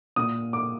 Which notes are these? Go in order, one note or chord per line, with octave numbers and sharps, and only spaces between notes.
A#2 D#6
D6